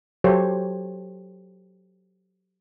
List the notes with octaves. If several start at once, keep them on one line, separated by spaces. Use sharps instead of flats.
F#3 G4 A4 C5 C#5